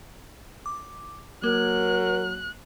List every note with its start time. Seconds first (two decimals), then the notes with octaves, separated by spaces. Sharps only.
0.66 D6
1.43 F#3 A#3 A#4 F#6